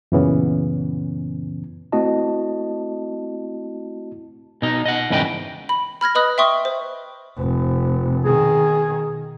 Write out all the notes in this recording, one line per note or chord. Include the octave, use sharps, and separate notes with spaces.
F#2 A#2 C#3 E3 B3 C#4
A3 C4 E4 F#4 D#5 A5
B2 D#4
D#5 F#5
E2 G#2 C#3 B4 D#5 G5
B5
B5 F6 G#6 A#6
B4 D#5 B5 D#6 F#6
E5 G5 C6 C#6 D#6
C5
F1
B2 D#3 G#4